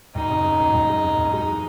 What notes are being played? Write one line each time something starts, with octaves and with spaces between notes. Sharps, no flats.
F#1 D#4
C#3
F#2
F#1
F#1
G#3
F#2
F#1
G#3 D#4
E3